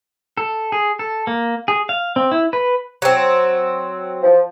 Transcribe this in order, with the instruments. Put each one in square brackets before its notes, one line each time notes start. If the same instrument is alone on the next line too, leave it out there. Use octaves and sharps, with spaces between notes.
[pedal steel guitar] A4
G#4
A4
A#3
G#4
F5
C4
E4
B4
[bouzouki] F#3 C4
[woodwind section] F3